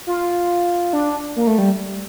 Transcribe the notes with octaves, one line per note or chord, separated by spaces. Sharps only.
F4
D4
A#3
A3
G3